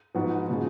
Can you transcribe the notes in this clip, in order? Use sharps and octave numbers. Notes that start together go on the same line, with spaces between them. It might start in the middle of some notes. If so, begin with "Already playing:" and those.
G#2 F3 B3 F#4
C#3 F3 G#3